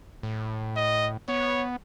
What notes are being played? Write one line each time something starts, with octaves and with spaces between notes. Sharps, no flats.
A2
D#5
B3 C#5